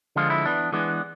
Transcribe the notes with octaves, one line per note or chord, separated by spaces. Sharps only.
D3 F3 G#3 F4
E4
E3 B3 D4
E3 G#3 B3 D4